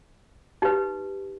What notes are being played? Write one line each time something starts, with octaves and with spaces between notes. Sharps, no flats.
D#4 G4 B4